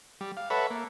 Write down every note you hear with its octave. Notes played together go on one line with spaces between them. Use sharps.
G3
F5
A4 B4 C#5 E5 F#5 B5
A#3